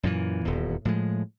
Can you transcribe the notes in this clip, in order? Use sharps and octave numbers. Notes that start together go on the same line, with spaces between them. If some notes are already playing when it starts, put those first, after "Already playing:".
F#2 A#2 E3
D#1 E2
A2 F3 G#3